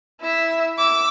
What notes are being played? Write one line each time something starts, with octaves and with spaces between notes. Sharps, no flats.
E4 E5
D6 E6